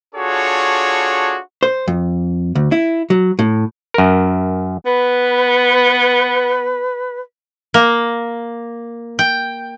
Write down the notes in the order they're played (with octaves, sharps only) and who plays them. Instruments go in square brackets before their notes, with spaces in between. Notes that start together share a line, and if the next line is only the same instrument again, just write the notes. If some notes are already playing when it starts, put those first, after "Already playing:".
[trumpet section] D4 F4 F#4 G#4 A4 C#5
[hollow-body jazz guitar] C5
F2
D2
E4
F#3
A2
[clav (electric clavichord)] F#2 A#4
[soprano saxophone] B3 [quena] B4
[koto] A#3
G5